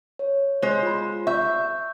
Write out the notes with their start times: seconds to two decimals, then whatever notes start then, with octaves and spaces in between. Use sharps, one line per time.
0.19 C#5
0.62 G#3 C5
0.82 F4 B5
1.27 E5 C#6 G6